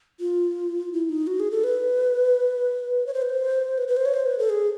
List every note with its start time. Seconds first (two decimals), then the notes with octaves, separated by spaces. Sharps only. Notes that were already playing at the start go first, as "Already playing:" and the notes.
0.20 F4
0.93 E4
1.09 D#4
1.27 F#4
1.40 G#4
1.51 A4
1.64 B4
3.06 C#5
3.14 C5
3.22 B4
3.30 C5
3.78 B4
3.88 B4
3.97 C5
4.05 C#5
4.14 C5
4.26 B4
4.39 A4
4.50 G#4